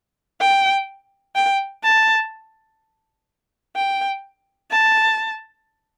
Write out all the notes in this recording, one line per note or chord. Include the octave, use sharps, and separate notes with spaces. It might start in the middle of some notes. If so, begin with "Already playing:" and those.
G5
G5
A5
G5
A5